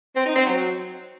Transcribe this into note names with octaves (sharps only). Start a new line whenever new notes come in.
C4
D#4
C4
F#3